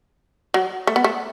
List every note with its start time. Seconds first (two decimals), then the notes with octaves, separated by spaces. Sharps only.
0.54 F#3
0.87 A3
0.96 B3
1.04 A3